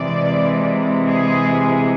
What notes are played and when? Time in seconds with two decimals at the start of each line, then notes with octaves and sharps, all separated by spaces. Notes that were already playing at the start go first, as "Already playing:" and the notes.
Already playing: C3 E3 G#3 D5
1.07 G#4